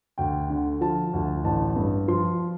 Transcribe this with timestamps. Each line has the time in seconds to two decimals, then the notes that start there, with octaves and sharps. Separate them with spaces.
0.18 D2 G5
0.50 D3
0.81 F3 A5
1.13 D2
1.44 A1 A5
1.76 G2
2.08 F3 C6